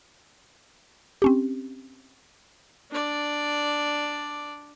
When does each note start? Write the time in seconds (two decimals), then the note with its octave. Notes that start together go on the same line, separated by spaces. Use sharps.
1.22 C4 C#4 G4
2.91 D4 D5